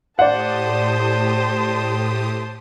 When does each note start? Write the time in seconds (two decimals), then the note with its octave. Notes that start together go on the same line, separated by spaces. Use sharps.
0.19 A2 G4 C5 D5 F#5 A5 D#6